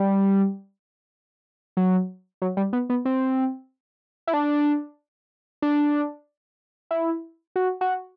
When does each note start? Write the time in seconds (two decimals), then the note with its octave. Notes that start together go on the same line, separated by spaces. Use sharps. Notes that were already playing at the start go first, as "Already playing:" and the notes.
Already playing: G3
1.77 F#3
2.42 F#3
2.57 G3
2.73 B3
2.90 B3
3.05 C4
4.27 E4
4.33 D4
5.62 D4
6.91 E4
7.56 F#4
7.81 F#4